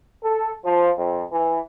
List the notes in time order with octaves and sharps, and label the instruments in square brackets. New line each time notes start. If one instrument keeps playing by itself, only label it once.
[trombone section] A4
F3
F2
E3